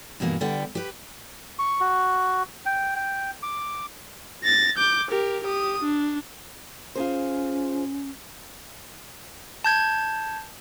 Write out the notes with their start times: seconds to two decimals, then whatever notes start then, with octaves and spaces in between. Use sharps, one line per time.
0.20 G2 B2 E3 A#3
0.41 D3 G3 B3 G5
0.75 G4 B4
1.59 C#6
1.80 F#4
2.66 G5
2.96 G5
3.43 D6
4.43 A6 A#6
4.78 D6 G6
5.11 G4 A#4
5.44 G4 D#6
5.83 D4
6.95 C#4 F4 G#4 C5
9.64 A5 G6 G#6